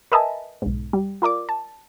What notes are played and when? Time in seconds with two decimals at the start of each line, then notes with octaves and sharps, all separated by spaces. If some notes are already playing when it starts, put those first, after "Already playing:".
0.12 A#4 B4 D#5 E5 G#5 A5
0.62 B1 G#2
0.93 G3
1.22 F4 A#4 D5 D6
1.49 A5